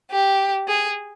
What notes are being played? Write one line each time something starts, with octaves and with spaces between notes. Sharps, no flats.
G4
G#4